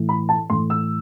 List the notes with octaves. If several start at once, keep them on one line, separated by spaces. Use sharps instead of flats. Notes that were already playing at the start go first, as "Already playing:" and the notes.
Already playing: A2 E3
B5
A5
A2 E3 C6
E6